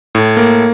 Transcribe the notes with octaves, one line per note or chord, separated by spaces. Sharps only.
A2
A#3